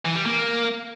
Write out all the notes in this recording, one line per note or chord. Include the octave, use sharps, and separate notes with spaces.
E3
G3
A#3